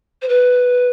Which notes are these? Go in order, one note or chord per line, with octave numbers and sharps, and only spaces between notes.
C5
B4